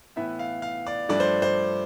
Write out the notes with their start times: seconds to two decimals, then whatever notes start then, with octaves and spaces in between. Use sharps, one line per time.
0.16 A2 E3 B3 E4 E5
0.39 F5
0.62 F5
0.87 D5
1.09 G2 F3 A3 D4 D5
1.20 C5
1.42 C5